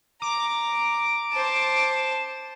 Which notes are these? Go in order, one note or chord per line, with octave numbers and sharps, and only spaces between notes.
A#5 D6
C5 A5